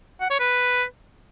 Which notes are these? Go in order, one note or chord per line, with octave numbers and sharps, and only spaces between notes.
F#5
C#5
B4